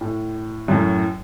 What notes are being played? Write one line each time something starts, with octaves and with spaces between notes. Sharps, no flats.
A2
F#2 A2